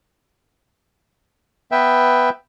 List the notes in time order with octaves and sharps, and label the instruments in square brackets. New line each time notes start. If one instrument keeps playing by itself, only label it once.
[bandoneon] B3 B4 E5 G5